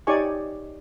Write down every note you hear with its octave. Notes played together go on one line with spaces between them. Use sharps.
D#4 G4 C#5 D5 G#5 C#6